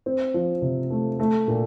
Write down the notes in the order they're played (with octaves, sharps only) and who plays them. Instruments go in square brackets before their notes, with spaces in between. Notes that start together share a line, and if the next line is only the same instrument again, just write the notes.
[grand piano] C4
F3
C3
A3
A3
A#2